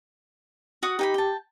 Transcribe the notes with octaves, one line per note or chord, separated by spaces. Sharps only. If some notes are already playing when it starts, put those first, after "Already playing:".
F#4 F#5 D#6
D#4 G4 G5 B5
G5 A5